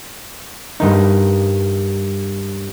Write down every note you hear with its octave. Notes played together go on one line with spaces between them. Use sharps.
G2 D#3 D#4